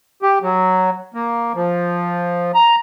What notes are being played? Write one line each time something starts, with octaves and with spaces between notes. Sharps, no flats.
G4
F#3
A#3
F3
A#5